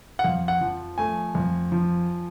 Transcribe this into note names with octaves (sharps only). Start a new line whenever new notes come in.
F#5
F2 F5
F#5
F3
A3 G#5
F2
F3